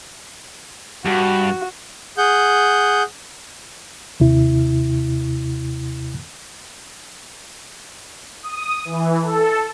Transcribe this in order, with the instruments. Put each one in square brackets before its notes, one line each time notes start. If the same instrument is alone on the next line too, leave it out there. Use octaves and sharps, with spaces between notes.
[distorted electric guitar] G2 [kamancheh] F#4
[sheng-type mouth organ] G#4 F#5 G6
[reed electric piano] D#2 C3 E4
[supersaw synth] D#6
E3
A4